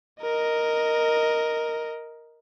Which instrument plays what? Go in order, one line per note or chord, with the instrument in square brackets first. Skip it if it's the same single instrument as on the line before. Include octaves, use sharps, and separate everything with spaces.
[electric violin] A#4 D#5